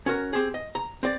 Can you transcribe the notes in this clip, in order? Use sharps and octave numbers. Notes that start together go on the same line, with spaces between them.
C#4 F#4 A#4
C4 G4 G#4
D#5
A#5
C4 D5